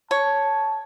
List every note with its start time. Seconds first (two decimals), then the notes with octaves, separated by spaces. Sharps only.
0.11 C#5 A5